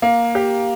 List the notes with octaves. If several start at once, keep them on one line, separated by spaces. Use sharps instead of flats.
A#3
G4